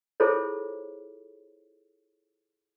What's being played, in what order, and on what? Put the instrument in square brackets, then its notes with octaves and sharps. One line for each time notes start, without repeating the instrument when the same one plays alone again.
[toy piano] E4 F4 G#4 A4 C5 C#5